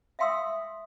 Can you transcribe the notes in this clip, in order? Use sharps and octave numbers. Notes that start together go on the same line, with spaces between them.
E5 F5 G5 C6 D#6 E6